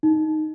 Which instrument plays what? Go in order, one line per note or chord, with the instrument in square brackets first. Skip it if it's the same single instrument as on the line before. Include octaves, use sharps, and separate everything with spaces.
[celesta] D#4